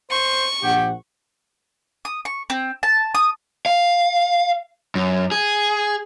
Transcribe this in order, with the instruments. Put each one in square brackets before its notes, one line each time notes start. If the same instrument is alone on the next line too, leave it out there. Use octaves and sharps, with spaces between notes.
[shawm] C5 [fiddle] C#6
[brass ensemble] A#1 F#5 [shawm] G4
[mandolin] D#6
C#6
C4
A5
D#6
[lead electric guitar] F5
F#2
G#4